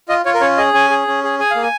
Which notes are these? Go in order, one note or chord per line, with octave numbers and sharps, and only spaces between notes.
F4 D#5
F4 C#5
A#4
C#4 C#5
G#4 D#5
C#4 G#5
G#4
C#4
G#4
G#4 G#5
A#3 F5
G#5